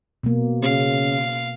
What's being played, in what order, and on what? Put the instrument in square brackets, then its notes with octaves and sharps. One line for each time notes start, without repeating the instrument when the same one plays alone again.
[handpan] B2 A#3
[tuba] C#3 [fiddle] F5